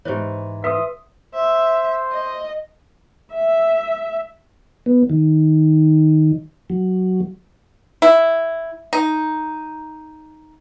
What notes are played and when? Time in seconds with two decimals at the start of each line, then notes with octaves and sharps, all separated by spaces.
0.05 G#2 E3 G4 C5 C#5
0.64 A4 B4 E5 C6 D#6
1.34 C5 E5
2.12 D#5
3.33 E5
4.86 B3
5.10 D#3
6.70 F#3
8.02 E4
8.93 D#4